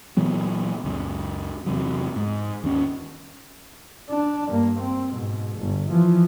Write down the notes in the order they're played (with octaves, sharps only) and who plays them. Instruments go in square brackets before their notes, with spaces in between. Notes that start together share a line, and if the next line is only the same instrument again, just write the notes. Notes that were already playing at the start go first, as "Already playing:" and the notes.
[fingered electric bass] A#2 E3 F#3 B3
C#2 F#2
E2 C3 F#3
G#2
D#2 C#4
[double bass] D4
G2 A#3
C4
G#2 B2
G1
E3 F3